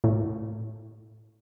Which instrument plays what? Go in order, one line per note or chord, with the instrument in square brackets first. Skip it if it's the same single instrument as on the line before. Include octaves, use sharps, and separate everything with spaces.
[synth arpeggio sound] A2